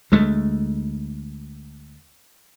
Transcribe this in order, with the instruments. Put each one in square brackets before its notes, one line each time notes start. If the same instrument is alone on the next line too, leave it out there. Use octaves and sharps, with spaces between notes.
[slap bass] D2 G#3 A3